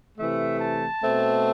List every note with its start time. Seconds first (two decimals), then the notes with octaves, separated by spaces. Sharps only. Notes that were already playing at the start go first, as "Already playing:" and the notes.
0.17 C3 E3 A3 E5
0.60 A5
1.02 B2 A3 C4